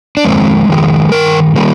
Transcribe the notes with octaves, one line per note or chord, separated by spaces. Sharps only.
D4
F2 D#3 G#3 C4
F2 D#3 G#3
G2 D#3 A#4
D#3 G3 A#3